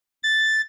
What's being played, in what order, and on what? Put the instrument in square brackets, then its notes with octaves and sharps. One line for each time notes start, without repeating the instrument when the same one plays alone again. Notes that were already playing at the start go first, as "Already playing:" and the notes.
[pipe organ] A6